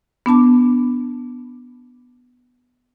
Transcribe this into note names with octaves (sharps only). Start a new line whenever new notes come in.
B3 D4 A5 D6